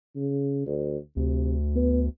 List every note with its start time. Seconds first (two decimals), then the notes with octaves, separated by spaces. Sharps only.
0.16 C#3
0.67 D2
1.16 D2 C3
1.76 B3